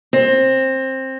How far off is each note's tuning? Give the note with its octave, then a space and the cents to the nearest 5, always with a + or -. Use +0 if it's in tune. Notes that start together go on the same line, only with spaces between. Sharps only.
C4 +15